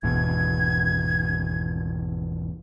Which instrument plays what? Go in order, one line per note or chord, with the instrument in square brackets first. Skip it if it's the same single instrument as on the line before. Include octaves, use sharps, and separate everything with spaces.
[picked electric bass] G#1 E2 B2 [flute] G#6